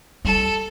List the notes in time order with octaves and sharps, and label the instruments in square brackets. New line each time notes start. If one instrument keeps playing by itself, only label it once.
[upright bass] G3 [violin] A4